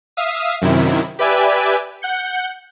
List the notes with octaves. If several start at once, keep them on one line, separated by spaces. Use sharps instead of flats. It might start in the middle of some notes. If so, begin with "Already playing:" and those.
E5 F5 D#6
F#2 C3 D#3 E4
G4 B4 D5 E5 G#5
F#5 G6 C#7